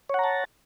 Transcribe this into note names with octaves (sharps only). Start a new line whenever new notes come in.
C#5 F#5 A5 A#5